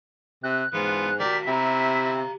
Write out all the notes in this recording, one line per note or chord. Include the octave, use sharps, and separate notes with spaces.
C3 F#6
G#2 E3 G#3 B3 F4
D#3 F#4 G4 A#4 D5 B6
C3 E4 G4 A#5